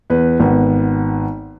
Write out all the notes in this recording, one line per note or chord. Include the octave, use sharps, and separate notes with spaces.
E2 B4
G#1 B3